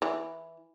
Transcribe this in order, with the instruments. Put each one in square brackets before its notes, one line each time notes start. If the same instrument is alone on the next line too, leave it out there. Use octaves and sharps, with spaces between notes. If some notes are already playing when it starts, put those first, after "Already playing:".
[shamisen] E3